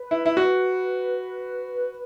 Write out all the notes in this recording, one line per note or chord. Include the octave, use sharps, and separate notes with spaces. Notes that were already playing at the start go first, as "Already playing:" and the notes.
Already playing: B4
E4
E4
F#4